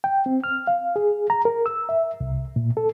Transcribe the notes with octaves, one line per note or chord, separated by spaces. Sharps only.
G5
C4
F6
F5
G#4
A#5
A#4
E6
E5
C2
A#2
A4